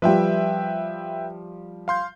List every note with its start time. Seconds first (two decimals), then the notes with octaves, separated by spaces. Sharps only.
0.02 F3 G3 B4 E5 G5
1.88 F5 C6 G6